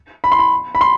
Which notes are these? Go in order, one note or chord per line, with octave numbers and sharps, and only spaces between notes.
B5
C6
B5
B5
C6